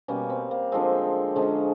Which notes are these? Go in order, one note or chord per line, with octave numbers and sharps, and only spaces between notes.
B2 G3 A#3 C#4
C4
A#3
D3 F3 G#3 C4
D3 F3 G#3 C#4